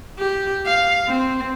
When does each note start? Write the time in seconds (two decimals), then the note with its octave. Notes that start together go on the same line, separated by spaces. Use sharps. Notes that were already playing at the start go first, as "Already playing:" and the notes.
0.19 G4
0.66 F5
1.08 C4